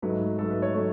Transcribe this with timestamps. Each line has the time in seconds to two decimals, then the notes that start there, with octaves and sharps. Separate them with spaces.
0.02 G#2 F#3 A3 B4
0.38 G#2 F#3 A3 A4
0.50 B4
0.62 C#5
0.74 F#3 A3 C#5